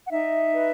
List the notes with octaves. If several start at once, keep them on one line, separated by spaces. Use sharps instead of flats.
F#5
D#4 E5
B4